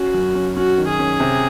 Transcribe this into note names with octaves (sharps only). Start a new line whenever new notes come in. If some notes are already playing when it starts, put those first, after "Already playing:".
Already playing: C#4 F#4
F#2
C#4
C#4 F#4
D#3
G#4
C#4
C3